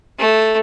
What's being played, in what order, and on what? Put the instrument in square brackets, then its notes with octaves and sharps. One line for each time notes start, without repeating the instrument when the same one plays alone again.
[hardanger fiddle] A3